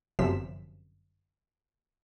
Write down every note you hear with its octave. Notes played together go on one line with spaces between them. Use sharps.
G1 F#2 C3 F3 B6 E7